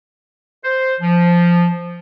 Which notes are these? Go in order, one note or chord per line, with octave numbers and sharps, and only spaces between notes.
C5
F3